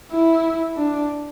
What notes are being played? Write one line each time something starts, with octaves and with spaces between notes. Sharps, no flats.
E4
D4